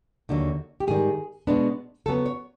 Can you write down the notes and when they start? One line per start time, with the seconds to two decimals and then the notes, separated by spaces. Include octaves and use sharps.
0.29 D#2 D3 F#3
0.80 G4
0.87 G#2 D#3 G3 G#4
1.47 B2 G#3 B3 D4
2.06 C#3 F#3 B3 A4
2.26 C#5